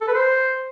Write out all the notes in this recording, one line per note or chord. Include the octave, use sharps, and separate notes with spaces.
A4
B4
C5